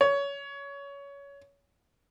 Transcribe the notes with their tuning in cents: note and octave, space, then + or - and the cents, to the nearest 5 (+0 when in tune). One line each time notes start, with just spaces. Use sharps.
C#5 +20